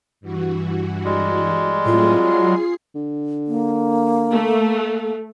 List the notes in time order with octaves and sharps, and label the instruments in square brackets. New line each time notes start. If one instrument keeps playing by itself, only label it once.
[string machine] G2 E3 F#4
[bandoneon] G3 G#3
[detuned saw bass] A2 [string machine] F#3 C4 G#4 [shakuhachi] F4
[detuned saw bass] F#3 [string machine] G#4 C7
[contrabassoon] D3
[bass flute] A#3
[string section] A3